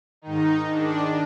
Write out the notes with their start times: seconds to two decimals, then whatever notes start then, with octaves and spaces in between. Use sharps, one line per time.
0.22 G#2 D#3 D#4
0.68 G#2 D#3 D4